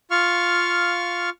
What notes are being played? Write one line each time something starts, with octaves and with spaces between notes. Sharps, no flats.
F4 F5 C#6 F6